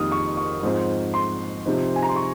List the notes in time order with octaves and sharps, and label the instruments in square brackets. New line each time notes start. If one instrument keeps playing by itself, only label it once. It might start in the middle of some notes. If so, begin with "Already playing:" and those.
Already playing: [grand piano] F2 D#3 G3 A#3 D#4 D#6 F6
C#6
C#6
G#2 F3 G#3 C4 D#4
C6
C3 F3 C4 D#4
G#5
A#5
C6
C#6